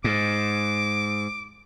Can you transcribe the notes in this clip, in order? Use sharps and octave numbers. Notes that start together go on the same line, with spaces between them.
G#2 D6